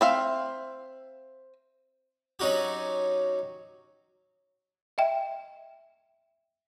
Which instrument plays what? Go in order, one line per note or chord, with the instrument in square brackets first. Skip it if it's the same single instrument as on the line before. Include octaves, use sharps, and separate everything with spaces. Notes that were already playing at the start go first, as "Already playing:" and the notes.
[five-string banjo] C4 E5 F5
[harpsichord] F#3 C#4 D#4 F#4 G4
[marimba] D#5 E5 G5